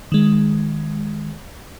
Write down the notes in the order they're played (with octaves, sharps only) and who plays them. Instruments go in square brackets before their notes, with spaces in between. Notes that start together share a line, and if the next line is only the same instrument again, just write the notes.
[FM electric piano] D#3 G#3